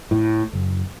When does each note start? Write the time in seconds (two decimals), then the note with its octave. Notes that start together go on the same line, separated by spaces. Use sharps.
0.11 A2
0.53 F#1